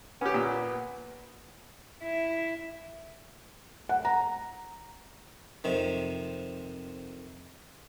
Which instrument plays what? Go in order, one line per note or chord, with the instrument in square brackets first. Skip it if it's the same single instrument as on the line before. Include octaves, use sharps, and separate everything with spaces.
[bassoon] B3 [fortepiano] C#4 G4
[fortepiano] A#2
[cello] E4
[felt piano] F#5
A#5
[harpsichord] F2 C3 D#3